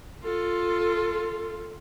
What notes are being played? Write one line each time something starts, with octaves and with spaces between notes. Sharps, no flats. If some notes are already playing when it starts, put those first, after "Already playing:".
F4 A4